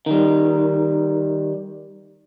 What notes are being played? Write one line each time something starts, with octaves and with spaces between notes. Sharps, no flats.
D#3 G3